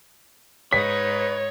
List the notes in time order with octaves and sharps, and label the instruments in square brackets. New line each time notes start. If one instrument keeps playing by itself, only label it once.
[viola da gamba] G#2 D#4 [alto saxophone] B4 [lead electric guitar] C#5 [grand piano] B6